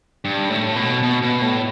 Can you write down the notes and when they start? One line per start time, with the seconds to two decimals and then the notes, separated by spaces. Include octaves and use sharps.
0.25 G2
0.50 A2
0.76 B2
1.03 B2
1.22 B2
1.41 A2